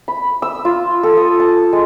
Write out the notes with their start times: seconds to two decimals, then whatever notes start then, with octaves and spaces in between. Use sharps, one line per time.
0.08 B5
0.42 E6
0.65 F4
1.03 A4
1.17 D#6
1.40 A5
1.73 G#3